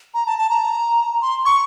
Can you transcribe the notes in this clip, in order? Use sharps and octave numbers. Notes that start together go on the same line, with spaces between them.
A#5
A5
A5
A#5
C6
C#6